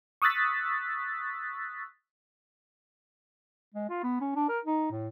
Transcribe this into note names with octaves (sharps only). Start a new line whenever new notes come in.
C#6 D#6 E6 F#6 A6 B6
G#3
F4
B3
C#4
D4
A#4
D#4
A2